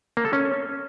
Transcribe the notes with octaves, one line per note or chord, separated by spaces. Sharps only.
A#3
A4
C#4